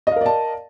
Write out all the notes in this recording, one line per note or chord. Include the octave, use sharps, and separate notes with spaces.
A#4 D5 D#5 F5 A5